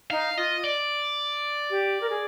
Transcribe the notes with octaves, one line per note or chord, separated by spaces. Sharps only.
D#4 F5
F4 D#5
D5
G4
A#4
G#4